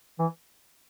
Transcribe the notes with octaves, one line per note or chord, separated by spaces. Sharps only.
E3